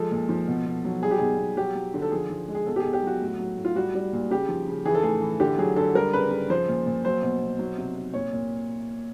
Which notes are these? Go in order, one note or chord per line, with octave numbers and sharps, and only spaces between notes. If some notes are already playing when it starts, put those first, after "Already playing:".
Already playing: F3 G#3 A4
A#2
F3
B2
B2
F#3
G3 G#4
G4
B2 G#4
B2
F#3 G4
F#3
D3
A4
F3 G#4
F3
G#3
G#4
B2 A4
G4
G#4
B2
G4
F#3 F#4
A2
F#3
A2
F4
G3 F#4
G3
A#2
C#3 G4
F3
C#3
E3 G#4
A4
A2 G#4
E3
D3 G4
F#3 G#4
D3 A4
G3 A#4
C#3 B4
C#3
F3 C5
A#2
A#2
F#3 C5
B2
B2
F#3
C3
C3
A#2 C#5
A#2